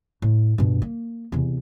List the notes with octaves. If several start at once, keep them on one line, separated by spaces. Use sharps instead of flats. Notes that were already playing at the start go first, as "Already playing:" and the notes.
A2
G2 B2
A#3
E2 C3